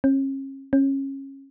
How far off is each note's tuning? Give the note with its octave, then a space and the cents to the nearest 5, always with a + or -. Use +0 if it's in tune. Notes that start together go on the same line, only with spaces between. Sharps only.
C#4 -40
C#4 -25